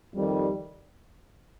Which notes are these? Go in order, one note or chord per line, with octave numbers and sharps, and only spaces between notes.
F2 D#3 G3